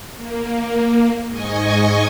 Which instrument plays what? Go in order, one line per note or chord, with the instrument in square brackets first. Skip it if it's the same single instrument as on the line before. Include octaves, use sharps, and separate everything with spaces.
[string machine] A#3
G#2 D#5 G#5 C#6